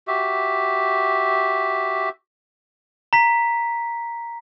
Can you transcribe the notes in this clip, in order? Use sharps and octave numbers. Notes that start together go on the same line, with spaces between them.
F#4 G4 E5
A#5 B6